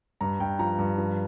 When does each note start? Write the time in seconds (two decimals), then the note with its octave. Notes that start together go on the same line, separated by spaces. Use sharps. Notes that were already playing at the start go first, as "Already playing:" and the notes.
0.21 G2 A#5
0.40 G2 G5
0.59 F3 A#5
0.79 G2
0.98 F3